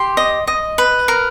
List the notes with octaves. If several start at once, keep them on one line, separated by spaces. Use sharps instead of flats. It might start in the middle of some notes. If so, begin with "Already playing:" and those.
Already playing: G4 C6
D#5
D#5
B4
A#4